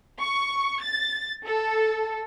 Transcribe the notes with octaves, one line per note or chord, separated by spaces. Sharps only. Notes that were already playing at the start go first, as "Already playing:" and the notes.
C#6
A6
A4